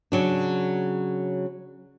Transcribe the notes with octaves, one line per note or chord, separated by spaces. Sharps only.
C#3 F#3 D4